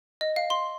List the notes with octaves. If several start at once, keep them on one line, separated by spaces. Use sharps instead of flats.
D#5
F5
C6